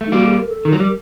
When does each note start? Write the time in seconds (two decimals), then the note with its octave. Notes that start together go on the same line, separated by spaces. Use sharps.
0.01 A3
0.07 D#4
0.12 G3 A#3 F#4
0.26 A4
0.30 G4
0.40 A#4
0.49 A4
0.65 D#3
0.69 F#3 A#4
0.80 G3